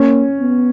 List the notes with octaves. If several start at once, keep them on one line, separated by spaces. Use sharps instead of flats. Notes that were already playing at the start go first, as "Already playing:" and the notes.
Already playing: A#3 C#4
B3